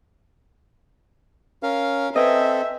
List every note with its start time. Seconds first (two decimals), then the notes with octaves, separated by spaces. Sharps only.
1.63 C#4 A#4 F5
2.16 C4 A4 B4 D#5 E5 G5 G#5